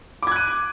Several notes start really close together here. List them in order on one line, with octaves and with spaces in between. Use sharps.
D6 G#6 F#6 D#7